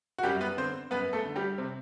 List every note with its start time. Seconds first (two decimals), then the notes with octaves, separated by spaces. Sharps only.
0.18 F#4
0.23 F#2 G3 G4
0.40 B3 B4
0.57 D3 C4 C5
0.91 F#2 B3 B4
1.13 A3 A4
1.25 D3
1.36 G3 G4
1.58 C3 C4